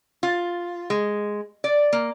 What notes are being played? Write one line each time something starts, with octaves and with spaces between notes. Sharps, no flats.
F4
G#3
D5
A#3